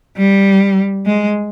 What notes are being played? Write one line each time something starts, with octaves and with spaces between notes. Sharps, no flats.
G3
G#3